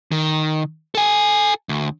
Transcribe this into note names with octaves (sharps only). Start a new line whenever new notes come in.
D#3
A4 G#5
D2